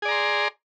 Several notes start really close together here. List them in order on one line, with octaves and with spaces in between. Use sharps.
G#4 D5 A#5 C6